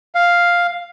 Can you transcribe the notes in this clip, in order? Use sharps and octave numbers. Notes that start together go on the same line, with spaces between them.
F5